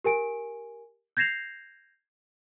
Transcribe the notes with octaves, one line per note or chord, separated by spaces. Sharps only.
G4 A#4 G#5 D7
G6 G#6 A#6 C7 E7 F7